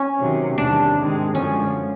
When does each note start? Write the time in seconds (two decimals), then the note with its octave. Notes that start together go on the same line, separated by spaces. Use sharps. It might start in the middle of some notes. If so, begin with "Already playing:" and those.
Already playing: C#4
0.20 C3 D#3 F#3
0.58 E2 C3 D#3 G3 D4
0.97 G#2 D#3 G#3 C4
1.34 F#2 D3 F3 G#3 C#4